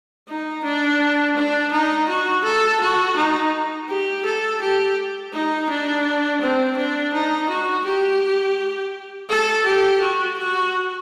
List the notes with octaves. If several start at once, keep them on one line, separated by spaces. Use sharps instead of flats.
D#4
D4
D4
D#4
F#4
A4
F#4
D#4
G4
A4
G4
D#4
D4
C4
D4
D#4
F#4
G4
A4
G4
F#4
F#4